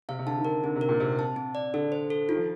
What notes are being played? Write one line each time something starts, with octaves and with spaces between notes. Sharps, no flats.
C3 F5
C3
D3 A5
D#3
D3 A#4
D3 C4
C3
A#4
A#2
C3 C4
A5
C4
D5
D3 A4
C5
A4
D#3 F4
F3